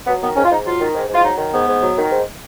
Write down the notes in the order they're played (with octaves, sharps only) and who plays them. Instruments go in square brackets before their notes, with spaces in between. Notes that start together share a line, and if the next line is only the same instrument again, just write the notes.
[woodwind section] F#3 B3
D#3 B3
G#2 C#4
F4
G#2 D#4
F#3 F4
D#3
G#2
G#2
F4
F#3 D#4
D#3
G#2 B3
G#2
F#3
D#3
G#2